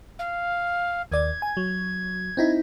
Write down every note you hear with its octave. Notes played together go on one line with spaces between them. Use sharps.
F5
D#2 D5 G#6
G#5
F#3
C4 D#4 E4